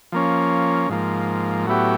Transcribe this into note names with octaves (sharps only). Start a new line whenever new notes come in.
F3 A#3 C#4
G#2 F3 A#3
A2 F#3 B3 E4 G4